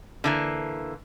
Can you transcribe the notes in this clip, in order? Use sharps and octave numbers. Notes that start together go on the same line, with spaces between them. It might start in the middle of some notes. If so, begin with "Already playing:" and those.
D3 E3 A#3